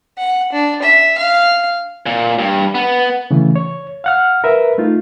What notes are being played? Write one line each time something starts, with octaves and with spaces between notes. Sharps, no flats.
F#5
D4
E5
F5
A#2
G2
B3
C#3 E3 A3
C#5
F5 F#5 F6
A#4 B4 E5
A3 D#4 F4